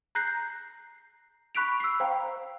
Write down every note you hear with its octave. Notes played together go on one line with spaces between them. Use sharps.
A#5 F#6 G6 A#6 C7
B5 C#6 F#6 B6 D7 F7
E6 C7
C5 F5 G5 A#5